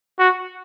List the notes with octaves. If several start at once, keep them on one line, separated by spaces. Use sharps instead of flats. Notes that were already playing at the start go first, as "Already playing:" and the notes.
F#4